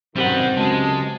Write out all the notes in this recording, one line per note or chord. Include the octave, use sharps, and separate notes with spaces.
B1 F#2 C3 D#3 G3 G4 B4 F#5
C#2 F#2 G#3 G4 A5